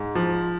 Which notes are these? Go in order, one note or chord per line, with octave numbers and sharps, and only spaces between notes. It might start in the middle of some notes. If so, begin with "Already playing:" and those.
Already playing: G#2
F3